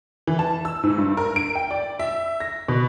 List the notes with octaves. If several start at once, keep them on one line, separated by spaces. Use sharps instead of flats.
E3
A5
E6
G#2
G2
A#4
D7
G5
D5
E5
A#6
B2